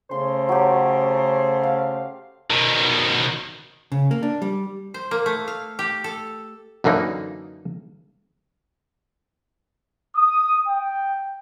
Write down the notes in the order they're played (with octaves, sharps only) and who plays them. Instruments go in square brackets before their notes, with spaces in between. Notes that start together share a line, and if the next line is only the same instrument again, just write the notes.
[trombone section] C#3 A3 C5 [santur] C6
[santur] F#3 G4
F5
[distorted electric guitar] B2 D#3
[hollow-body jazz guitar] C#3
A#3
D4
G3
[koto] C5
A#3
A3
F5
G4
A4
[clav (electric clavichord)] F#2 D3 E3 A#3 D#4
[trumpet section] D#6
G5